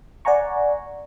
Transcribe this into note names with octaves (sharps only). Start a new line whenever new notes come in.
D5 F#5 G#5 A#5 C#6